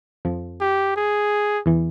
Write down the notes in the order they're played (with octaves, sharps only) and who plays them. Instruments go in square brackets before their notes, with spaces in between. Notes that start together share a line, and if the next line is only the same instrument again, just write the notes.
[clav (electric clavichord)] F2 F3
[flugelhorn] G4
G#4
[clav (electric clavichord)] E2 E3